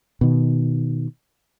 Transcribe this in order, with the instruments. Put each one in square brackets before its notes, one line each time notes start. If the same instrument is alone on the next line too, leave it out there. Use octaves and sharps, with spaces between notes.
[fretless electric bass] B2 D#3